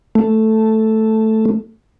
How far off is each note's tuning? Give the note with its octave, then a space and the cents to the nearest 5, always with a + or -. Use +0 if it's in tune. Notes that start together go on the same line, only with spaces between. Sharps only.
A3 +0